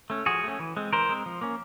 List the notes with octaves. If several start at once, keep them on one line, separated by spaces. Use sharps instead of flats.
A3 C#4
F3 F#4 G#4
A3 C#4
E3
G#3 C4
E3 A#4 C5
G#3 C4
F3
A#3 C#4